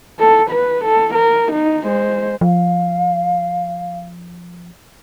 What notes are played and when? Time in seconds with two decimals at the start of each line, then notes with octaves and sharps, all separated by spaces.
0.20 A4
0.50 B4
0.85 A4
1.14 A#4
1.52 D#4
1.84 G#3 C5
2.41 F3 F5